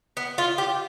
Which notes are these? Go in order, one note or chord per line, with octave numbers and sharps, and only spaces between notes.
B3
F4
G4